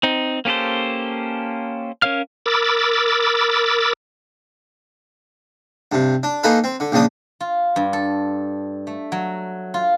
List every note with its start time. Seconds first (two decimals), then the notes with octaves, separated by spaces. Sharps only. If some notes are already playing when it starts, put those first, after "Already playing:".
0.03 C4 D#4
0.45 A#3 C#4 G4 A4 C5
2.02 C#4 A#4 C#5 F5 F6
2.46 A#4 B5 D6 E6 A6
5.92 G2 C3
6.23 D4
6.43 A#3 D#4 G#4 A4 B4
6.64 C4
6.80 D3
6.92 A#1 C#3 F3 D4 D#6
7.40 F4
7.76 G2
7.93 A4
8.87 A3
9.12 F#3
9.74 F4